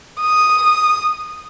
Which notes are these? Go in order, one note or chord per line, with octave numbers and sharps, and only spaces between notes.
D#6